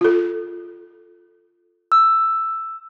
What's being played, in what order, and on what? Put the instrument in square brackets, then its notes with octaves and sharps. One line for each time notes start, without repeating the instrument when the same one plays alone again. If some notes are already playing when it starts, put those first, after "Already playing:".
[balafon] F4 A4
[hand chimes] E6